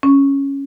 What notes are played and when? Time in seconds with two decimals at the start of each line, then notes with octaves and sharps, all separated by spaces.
0.03 C#4